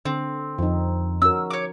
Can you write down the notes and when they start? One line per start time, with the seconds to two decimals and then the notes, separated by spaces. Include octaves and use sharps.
0.05 D3 C4
0.58 F2 F3 D#4
1.22 C#4 F#4 A#4 E6
1.50 C#5 D6